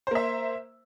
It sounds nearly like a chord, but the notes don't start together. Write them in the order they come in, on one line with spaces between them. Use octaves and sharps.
C5 A#3 E5